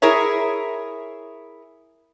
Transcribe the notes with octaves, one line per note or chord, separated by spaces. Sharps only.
E4 G#4 A#4 C#5 E5